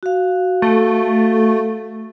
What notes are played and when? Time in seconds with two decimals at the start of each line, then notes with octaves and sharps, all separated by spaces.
0.03 F#4 F5
0.62 A3